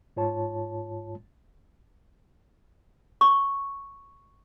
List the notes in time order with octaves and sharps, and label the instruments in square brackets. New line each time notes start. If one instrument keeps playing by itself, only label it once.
[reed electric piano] G#2 F4 C#5 A5
[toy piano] C#6